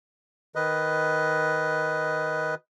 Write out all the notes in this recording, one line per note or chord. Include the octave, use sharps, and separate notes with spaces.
D#3 B4 D#5